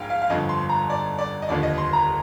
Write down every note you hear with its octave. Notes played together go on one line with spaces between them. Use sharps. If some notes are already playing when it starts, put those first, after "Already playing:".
Already playing: A#1 G#2 F5 G5 G#5
F5
F5
G1 F2 D3 F3 D#5
C6
A#5
D5
D5
D#5
F1 D#2 D3 F3 D5
D#5
C6
A#5